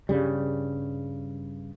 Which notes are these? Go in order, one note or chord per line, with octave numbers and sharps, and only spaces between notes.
G2 C#3 G3